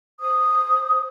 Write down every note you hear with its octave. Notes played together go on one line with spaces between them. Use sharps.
C5 D#6